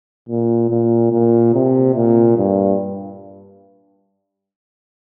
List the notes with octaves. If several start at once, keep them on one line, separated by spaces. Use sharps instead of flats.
A#2
A#2
A#2
C3
A#2
G2